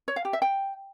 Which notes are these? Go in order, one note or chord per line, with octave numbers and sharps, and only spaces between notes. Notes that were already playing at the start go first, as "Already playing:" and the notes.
C#5
F5
G4
E5
G5